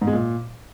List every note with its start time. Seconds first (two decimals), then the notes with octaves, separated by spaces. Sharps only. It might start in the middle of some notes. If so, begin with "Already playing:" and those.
0.01 G#2
0.07 G#3
0.13 A#2